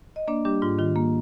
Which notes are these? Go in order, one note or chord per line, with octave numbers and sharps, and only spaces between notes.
D#5
A#3 D4 D5
G3 D4 G4
G#2 F4
D#3 F4
A#3